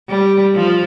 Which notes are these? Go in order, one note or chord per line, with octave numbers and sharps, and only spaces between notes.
G3
F3